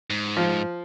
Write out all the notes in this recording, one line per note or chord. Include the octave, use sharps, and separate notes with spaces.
G#2
F3